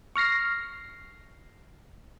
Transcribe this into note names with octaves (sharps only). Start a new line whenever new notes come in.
C#6 F6 A#6 C7